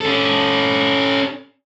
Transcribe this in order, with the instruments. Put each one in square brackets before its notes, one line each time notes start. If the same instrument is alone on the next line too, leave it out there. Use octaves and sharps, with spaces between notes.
[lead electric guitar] C#4 A4